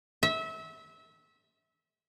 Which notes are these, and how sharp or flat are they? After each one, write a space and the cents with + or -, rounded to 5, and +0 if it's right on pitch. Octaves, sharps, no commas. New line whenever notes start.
E5 -25